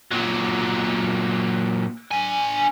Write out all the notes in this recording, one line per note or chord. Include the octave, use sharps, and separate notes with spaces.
A#2 F#3
D4 G#5